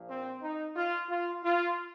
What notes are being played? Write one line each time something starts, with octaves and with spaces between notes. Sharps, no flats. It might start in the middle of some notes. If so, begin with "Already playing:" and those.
Already playing: A#1 A#2 F3
C4
D#4
F4
F4
F4